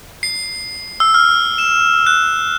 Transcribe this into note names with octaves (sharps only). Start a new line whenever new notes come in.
C7
E6
F6
E7
F#6